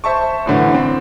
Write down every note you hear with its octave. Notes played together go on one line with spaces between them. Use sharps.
C5 E5 A5 C#6
F#2 A2 D3 E3
C4